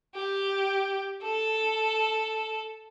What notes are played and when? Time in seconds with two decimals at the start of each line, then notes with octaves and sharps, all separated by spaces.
0.15 G4
1.22 A4